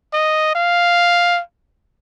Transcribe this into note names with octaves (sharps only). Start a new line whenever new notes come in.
D#5
F5